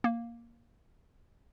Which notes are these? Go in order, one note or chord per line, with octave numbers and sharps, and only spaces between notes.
A#3